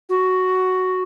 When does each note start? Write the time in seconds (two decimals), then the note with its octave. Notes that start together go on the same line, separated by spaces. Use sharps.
0.09 F#4